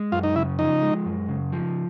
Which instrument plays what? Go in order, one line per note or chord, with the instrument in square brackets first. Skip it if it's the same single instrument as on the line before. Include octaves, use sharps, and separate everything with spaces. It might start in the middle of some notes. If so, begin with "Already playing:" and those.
Already playing: [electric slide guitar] G#3
[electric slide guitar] F#2 [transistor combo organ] F4
[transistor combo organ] D#4
[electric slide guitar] C#3 [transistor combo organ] E4
[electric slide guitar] F3 [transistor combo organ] D#4
[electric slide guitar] G#3
F#2
C#3
F3